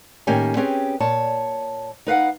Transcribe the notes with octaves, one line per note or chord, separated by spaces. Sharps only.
A2 D#3 A#3 C#4 G4 G#5
C4 C#4 G4 G#4 B4
A#2 C#5 A5
D#4 B4 F5 F#5